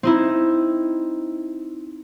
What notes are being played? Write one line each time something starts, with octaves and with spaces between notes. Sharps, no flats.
C4 D#4 E4